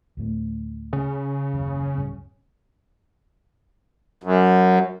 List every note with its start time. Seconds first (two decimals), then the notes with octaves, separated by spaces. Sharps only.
0.17 D2 A2 A3
0.93 C#3
1.53 F#1 D#2
1.95 D1 G2 C#4
4.23 F#2